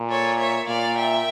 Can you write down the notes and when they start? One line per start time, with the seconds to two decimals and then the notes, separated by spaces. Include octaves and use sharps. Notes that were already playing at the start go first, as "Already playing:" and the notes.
Already playing: A#2
0.10 A4 C#5
0.39 C#5 E5
0.68 A#2 D5 F5
0.97 E5 G5